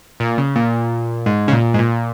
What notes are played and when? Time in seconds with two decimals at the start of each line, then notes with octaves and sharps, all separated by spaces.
0.20 A#2
0.38 C#3
0.55 A#2
1.26 G#2
1.48 C#3
1.53 A#2
1.74 G#2
1.79 A#2